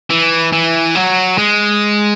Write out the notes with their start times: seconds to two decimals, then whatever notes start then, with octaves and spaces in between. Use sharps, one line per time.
0.10 E3
0.52 E3
0.96 F#3
1.38 G#3